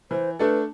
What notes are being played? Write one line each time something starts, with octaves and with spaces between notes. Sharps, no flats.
E3 C5
A3 D4 A4 B4